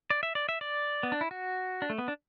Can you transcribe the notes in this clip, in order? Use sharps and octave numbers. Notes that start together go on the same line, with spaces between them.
D5
E5
D5
E5
D5
B3
D4
E4
F#4
D4
A3
B3
D4